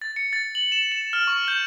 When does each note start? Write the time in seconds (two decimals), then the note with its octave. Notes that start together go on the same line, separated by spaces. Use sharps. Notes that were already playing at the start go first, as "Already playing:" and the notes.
0.02 A6
0.16 C#7
0.33 A6
0.55 F#7
0.72 E7
0.92 E7
1.13 F6
1.27 C#6
1.48 G6